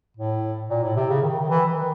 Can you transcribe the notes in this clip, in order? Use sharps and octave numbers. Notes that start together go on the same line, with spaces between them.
A2
A#2
A2
C3
C#3
D#3
D#3
E3
E3
D#3